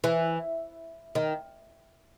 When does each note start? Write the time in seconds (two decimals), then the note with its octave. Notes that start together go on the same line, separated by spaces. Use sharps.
0.04 E3
1.15 D#3